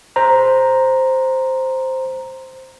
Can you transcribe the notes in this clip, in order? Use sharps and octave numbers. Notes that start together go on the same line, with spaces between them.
C5 A#5